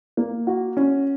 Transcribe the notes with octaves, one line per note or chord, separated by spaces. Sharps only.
A#3
F#4
C#4